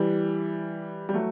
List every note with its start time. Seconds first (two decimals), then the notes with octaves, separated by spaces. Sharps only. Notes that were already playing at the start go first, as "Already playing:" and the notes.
Already playing: E3 G3
1.09 G3
1.14 F#3 A3